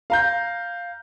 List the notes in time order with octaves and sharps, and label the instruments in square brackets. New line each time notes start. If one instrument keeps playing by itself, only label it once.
[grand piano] F5 A#5 G6